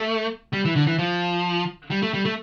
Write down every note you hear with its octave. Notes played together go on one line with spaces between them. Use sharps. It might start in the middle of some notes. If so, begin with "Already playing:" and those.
Already playing: A3
G3
E3
D3
E3
F3
G3
A3
G3
A3